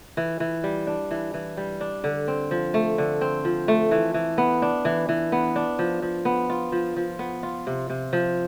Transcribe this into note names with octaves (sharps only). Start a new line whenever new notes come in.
E3
E3
G3
D4
E3
E3
G3
D4
D3
C4
F3
A3
D3
C4
F3
A3
E3
E3
B3
D4
E3
E3
B3
D4
F3
F3
B3
F4
F3
F3
B3
F4
C3
C3
F3